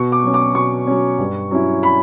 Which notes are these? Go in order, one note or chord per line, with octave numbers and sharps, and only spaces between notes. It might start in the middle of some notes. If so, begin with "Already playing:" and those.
Already playing: B2 C#6
D6
F#3 C#4
D6
B2 C#6
F#3 C#4
G2
F#3 C#4 E4
B5